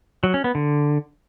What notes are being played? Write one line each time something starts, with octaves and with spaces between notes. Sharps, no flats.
F#3
C#4
B3
D3